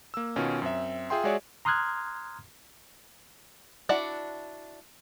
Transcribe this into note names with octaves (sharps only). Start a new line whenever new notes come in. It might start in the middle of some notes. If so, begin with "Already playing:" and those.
A#3 E6
B2 D#3 C#4 F4
F#2 C4 E5
F4 G#4 E5 G5 C6
G#3 F#4 G#4 C#5 D5 E5
A#5 C6 D#6 F6 F#6 G#6
D4 E4 F#4 D5 F#5